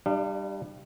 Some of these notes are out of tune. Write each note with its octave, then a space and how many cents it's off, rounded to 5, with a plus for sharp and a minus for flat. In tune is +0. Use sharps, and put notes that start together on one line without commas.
G3 +0 D4 +40 F5 -30